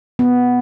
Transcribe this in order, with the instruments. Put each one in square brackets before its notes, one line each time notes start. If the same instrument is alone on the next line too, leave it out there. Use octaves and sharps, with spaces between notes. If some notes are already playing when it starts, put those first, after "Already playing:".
[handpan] B3